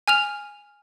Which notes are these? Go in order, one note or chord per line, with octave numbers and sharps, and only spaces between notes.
G#5 F6 F7